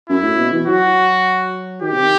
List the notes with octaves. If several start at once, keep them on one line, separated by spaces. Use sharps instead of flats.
F#2 E4
A2
B2
E3
F#3 F#4
D#3 G4
C3
D#3